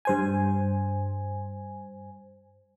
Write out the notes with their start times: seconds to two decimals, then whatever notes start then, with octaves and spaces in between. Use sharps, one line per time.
0.05 G2 C5 G#5